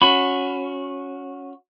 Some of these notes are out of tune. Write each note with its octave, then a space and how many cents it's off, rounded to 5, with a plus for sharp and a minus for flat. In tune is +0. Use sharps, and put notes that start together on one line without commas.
C#4 +0 F#4 -15 B5 +15